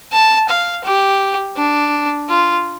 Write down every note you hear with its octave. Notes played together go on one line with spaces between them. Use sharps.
A5
F5
G4
D4
F4